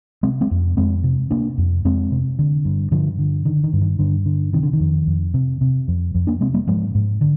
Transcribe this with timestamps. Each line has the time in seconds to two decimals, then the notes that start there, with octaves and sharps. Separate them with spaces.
0.23 C3 G#3 C4
0.41 G#3 C4
0.51 F2
0.77 F2 G#3 C4
1.04 C3
1.31 C3 A#3 D4
1.58 F2
1.85 F2 G#3 C4
2.12 C3
2.39 D3
2.65 G2
2.91 G2 D3 F3
3.19 D3
3.45 D3 D#3
3.64 D#3
3.73 G2
3.81 D#3
3.99 G2 D3
4.26 D3
4.53 C3 D#3
4.63 D3
4.73 D#3
4.80 F2
5.07 F2
5.34 C3
5.61 C3
5.88 F2
6.15 F2
6.27 A#3 D4
6.41 C3 G#3 C4
6.54 G3 A#3
6.67 G#2 F3 G#3
6.95 G#2
7.21 D3